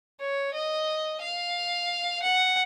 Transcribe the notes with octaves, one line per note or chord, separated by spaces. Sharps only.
C#5
D#5
F5
F#5